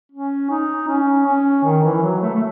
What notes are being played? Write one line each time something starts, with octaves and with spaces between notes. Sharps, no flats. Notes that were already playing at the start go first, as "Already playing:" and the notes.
C#4
D#4
C#4
C#4
D#3
E3
F#3
A3
A3